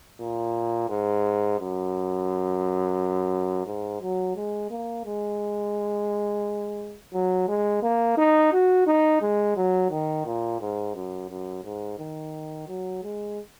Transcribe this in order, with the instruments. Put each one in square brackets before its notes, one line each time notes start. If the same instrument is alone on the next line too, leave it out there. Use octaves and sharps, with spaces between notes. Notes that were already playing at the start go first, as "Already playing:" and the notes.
[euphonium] A#2
G#2
F#2
G#2
F#3
G#3
A#3
G#3
F#3
G#3
A#3
D#4
F#4
D#4
G#3
F#3
D#3
A#2
G#2
F#2
F#2
G#2
D#3
F#3
G#3